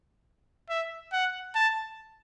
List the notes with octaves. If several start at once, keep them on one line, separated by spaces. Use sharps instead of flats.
E5
F#5
A5